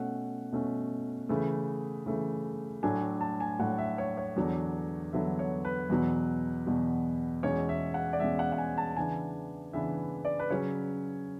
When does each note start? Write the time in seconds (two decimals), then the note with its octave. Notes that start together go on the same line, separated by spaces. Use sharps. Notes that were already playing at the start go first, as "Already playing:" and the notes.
Already playing: B2 A3 C#4 F#5
0.52 B2 A3 C#4
1.29 C#3 E3 A3
2.06 C#3 E3 A3
2.83 A2 F#3 A3 D4 G#5
3.21 A5
3.40 G#5
3.59 A2 F#3 A3 D4 F#5
3.78 E5
3.98 C#5
4.17 C#5
4.36 E2 D3 F#3 B3 D4
5.13 E2 D3 F#3 B3 D4 E5
5.39 C#5
5.65 B4
5.89 E2 B2 F#3
6.67 E2 B2 F#3
7.43 E2 B2 G#3 C#4 C#5
7.69 E5
7.94 F#5
8.13 D5
8.20 E2 B2 G#3 C#4 E5
8.39 F#5
8.52 F#5
8.58 G#5
8.78 A5
8.97 C#3 E3 B3 D4 G#5
9.73 C#3 E3 B3 D4 E5
10.25 D5
10.39 B4
10.50 C#3 F#3 C#4 C#5